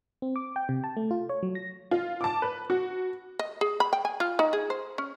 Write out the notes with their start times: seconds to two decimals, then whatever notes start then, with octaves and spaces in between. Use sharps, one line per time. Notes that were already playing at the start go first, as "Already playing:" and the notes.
0.22 C4
0.36 D6
0.56 G5
0.69 C3
0.84 A5
0.97 A3
1.11 F4
1.29 C#5
1.43 F#3
1.55 A#6
1.91 F4
2.21 A5 D6
2.42 B4
2.70 F#4
3.39 D#5
3.61 G#4
3.80 B5
3.93 G5
4.05 G#5
4.20 F4
4.39 D#4
4.53 G#4
4.70 C5
4.98 C#4